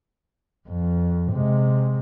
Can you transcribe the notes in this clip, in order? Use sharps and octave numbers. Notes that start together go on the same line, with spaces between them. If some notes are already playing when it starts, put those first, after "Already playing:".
F2
C3 G#3